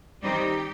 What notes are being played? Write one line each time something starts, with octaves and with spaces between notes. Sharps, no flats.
D#3 G3 C4 D#4 G4